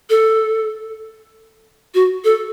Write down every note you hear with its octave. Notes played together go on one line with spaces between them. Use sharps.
A4
F#4
A4